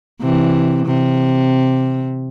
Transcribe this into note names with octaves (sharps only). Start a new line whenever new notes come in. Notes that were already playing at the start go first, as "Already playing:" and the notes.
C3 E3
C3